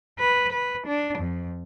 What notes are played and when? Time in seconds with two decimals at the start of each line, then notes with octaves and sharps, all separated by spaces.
0.19 B4
0.52 B4
0.87 D4
1.18 F2